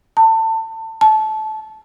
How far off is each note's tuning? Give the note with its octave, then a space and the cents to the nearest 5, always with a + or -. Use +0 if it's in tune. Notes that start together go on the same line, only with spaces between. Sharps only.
A5 +25
A5 -20